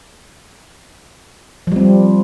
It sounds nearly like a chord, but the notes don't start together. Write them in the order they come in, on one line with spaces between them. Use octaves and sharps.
F3 G3 C4